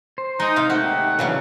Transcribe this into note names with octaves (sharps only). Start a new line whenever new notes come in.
C5
G#3 D#4
C3 F5
D#2 A3 D#4 F#5
G4
A#2 C#3 E3 F#3 F5